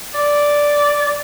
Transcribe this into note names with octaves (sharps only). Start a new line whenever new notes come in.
D5